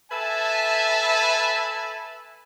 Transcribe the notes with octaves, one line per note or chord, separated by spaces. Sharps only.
A4 B4 E5 G#5 A5